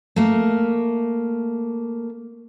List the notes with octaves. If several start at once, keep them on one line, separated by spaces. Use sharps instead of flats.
A3 A#3